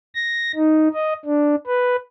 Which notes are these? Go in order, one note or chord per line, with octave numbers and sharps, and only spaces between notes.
A#6
D#4
D#5
D4
B4